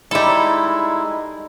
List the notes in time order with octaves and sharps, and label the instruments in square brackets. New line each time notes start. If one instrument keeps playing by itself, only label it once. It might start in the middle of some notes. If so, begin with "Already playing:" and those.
[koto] G3 A4 [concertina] G#3 E4 [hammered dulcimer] D#4 D6